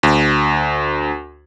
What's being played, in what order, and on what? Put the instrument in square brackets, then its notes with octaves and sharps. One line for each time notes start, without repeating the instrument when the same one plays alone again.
[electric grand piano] D2